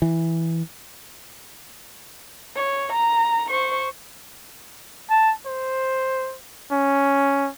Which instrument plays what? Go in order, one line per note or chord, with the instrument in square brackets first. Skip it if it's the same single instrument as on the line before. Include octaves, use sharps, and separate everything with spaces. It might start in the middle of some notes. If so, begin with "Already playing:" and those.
[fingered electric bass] E3
[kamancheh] C#5
A#5
C5 C#6
[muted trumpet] A5
C5
C#4